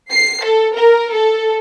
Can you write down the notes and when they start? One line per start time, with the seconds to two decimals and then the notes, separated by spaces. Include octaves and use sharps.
0.11 C7
0.42 A4
0.75 A#4
1.13 A4